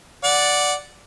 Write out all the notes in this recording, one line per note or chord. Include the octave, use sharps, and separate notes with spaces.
D5 F#5